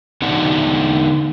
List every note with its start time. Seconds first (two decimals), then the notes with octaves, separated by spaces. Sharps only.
0.22 D3 B3 D4 D#4 F#5